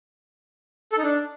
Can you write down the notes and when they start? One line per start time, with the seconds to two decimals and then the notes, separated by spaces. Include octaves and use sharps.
0.92 A4
0.98 D#4
1.03 D4